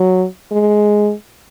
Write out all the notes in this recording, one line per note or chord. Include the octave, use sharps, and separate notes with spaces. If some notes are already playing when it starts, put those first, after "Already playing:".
Already playing: F#3
G#3